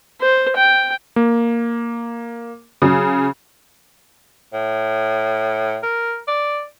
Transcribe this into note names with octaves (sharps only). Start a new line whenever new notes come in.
C5
G5
A#3
C#3 F#3
A2
A#4
D5